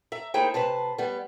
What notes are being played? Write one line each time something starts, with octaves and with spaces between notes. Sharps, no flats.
E5 A#5
A#3 D#4 E4 G#4 C5 G5
C3 B4 C5 A5
G3 B3